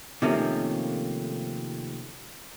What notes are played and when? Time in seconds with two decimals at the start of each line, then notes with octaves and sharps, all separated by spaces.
0.22 C3 D#3 F3 A3 A#3 C#4